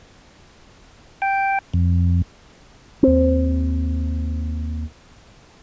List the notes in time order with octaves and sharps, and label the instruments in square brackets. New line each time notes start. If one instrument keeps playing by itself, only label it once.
[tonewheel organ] G5
F2
[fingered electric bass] D#2 C4